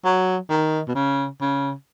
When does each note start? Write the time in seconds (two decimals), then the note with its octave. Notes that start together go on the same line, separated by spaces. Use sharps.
0.05 F#3
0.49 D#3
0.88 B2
0.95 C#3
1.41 C#3